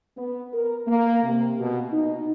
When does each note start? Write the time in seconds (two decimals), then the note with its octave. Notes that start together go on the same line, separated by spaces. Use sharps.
0.17 B3
0.53 A#4
0.88 A#3
1.23 C3
1.59 B2
1.92 D#4